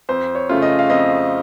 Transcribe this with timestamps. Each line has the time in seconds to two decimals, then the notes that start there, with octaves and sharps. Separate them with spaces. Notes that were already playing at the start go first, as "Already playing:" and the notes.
0.09 F2 C5
0.35 C#5
0.49 C#3 A3 C#4 F4
0.62 D#5
0.79 F5
0.90 F2 D#5